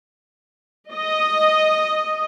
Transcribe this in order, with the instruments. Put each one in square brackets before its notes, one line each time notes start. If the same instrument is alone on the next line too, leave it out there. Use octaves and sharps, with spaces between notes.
[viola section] D#5